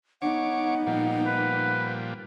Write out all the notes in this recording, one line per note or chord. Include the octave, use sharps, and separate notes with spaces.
B3 D#4 C#5 F#5 D6
A#2 F3 G3
B4